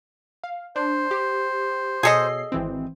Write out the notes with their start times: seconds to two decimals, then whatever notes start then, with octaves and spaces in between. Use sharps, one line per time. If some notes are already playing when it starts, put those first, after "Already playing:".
0.44 F5
0.76 D4 C5
1.11 G4
2.03 B2 G#4 A4 C#5 D#5 C7
2.52 G#1 E3 C4